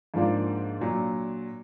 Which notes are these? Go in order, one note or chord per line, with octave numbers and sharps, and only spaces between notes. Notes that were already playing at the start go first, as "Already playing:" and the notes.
G#2 F3 A#3 D4 F4
A#2 F#3 D4